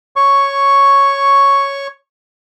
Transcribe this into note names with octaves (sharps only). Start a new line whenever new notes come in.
C#5 C#6